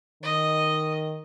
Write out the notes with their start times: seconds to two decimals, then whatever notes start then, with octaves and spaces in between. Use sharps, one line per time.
0.23 D#3 D#5